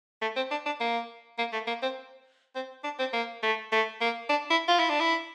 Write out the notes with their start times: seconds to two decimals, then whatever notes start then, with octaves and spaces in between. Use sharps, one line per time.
0.21 A3
0.36 C4
0.51 D4
0.66 D4
0.80 A#3
1.38 A#3
1.53 A3
1.67 A#3
1.82 C4
2.55 C4
2.84 D4
2.99 C4
3.13 A#3
3.43 A3
3.72 A3
4.01 A#3
4.29 D4
4.50 E4
4.68 F4
4.79 E4
4.90 D4
5.00 E4